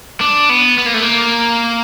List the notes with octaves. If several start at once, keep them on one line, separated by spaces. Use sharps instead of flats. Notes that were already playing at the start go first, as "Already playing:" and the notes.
D4
B3
B3
A#3
A3
A#3